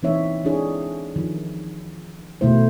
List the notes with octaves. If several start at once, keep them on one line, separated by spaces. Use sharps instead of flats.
E3 A#3 C4 D#4 C#5 E5
C4 D4 E4 G#4 C#5
D#3 F3
B2 D#3 A3 E4 C5